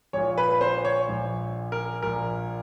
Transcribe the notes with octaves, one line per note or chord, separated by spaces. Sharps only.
A#1 A#2 C#5
B4
C5
C#5
A#1 A#2
A#4
A#1 A#2 A#4